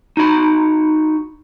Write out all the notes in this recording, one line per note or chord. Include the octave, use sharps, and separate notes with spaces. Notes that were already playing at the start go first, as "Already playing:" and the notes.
D#4 F#4 B5